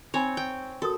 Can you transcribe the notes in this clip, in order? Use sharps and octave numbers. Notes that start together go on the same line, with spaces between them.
C4 D#4 C#5 G#5 B5
G5
F#4 A4 A#4 D#6